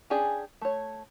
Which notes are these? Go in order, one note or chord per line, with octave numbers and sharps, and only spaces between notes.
C#4 D4 G4 G#4 D5
A3 C#5